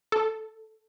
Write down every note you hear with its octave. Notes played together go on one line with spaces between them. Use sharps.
A4